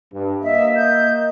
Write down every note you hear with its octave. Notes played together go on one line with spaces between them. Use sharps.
G2
A#3 D#5 E5
G6